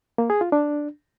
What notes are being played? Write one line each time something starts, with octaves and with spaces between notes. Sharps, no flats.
A#3
G#4
F4
D4